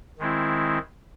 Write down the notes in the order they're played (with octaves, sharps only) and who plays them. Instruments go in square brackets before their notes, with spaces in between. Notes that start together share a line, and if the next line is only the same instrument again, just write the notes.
[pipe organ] D#3 G#3 C4 E4